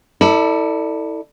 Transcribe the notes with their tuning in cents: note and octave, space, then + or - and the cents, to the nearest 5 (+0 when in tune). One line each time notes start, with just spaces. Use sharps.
E4 -25 A4 +25 D5 +15